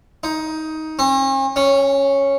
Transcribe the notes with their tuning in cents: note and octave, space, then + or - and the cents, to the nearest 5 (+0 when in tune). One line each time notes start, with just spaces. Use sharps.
D#4 +15
C#4 -45
C#4 -5